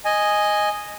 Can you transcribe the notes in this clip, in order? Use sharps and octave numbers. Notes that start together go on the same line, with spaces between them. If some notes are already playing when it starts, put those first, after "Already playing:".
D#5 G#5